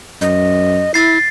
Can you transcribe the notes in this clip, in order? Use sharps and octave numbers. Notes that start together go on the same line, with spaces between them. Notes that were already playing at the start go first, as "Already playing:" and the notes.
F#2 D#5
E4 A6 C7